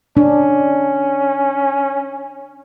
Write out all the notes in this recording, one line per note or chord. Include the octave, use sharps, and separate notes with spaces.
C#4 D4